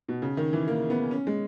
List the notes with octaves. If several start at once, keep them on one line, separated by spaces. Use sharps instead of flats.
B2
C#3
D#3
E3
A#3
B3
C#4
G#3